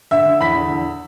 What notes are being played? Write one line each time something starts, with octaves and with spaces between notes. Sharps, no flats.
D3 E5 E6
D3
E2 B5 B6
D3
E2